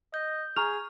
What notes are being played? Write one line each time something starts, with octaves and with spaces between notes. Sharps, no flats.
D#5 G6
G#4 A#5 C#6 F6 F7